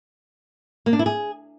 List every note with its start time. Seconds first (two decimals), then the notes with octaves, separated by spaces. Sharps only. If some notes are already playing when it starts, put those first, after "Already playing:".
0.86 A#3
0.93 D4
0.99 E4
1.06 G#4